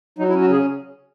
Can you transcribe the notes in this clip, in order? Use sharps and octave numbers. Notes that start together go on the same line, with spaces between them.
F#3 D#4
E4
C#4
F#4
C#3 G#4